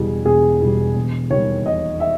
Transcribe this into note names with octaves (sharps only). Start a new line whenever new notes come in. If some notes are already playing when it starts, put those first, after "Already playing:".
Already playing: E1 E2 B2 G3 G#4
E1 G#4
E2 B2 G3
E1
D#2 D#3 G3 C#5
E1 D#5
E5